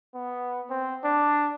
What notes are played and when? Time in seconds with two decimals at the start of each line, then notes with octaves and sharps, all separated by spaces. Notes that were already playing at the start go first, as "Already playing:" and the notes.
0.14 B3
0.70 C4
1.04 D4